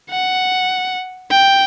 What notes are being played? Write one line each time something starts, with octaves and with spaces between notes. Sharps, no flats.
F#5
G5